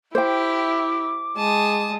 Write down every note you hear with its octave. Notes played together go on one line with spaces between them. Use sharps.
E4 G4 C5 G5 D6
G#3 A5 D#6